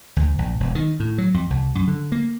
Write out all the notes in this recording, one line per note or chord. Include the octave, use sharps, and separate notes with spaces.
D2
A#1
E1
D#3
A2
F#3
F2
C2
F#2
D3
A#3